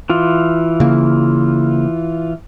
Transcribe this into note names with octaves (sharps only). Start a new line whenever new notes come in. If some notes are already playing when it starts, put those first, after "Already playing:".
E3 F4
C#3 A#3